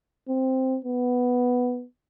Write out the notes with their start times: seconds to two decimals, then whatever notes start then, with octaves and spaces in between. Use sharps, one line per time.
0.29 C4
0.85 B3